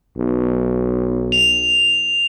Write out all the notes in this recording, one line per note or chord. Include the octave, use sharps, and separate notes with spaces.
B1
F7